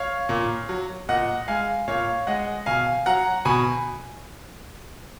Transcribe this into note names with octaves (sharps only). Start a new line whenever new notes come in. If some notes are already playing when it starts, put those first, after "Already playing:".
Already playing: C#5 F5
A#2
F#3
A#2 D#5 F#5
G#3 F5 G#5
A#2 C#5 F5
G#3 D#5 F#5
B2 F5 G#5
F#3 F#5 A#5
B2 G#5 B5